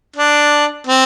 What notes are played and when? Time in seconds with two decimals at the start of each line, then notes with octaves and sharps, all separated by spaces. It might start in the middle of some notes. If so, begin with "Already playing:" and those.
0.16 D4
0.87 C4